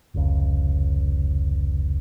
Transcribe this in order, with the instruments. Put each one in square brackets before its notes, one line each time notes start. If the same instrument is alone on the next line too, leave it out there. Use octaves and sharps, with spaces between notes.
[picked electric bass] F1 C#2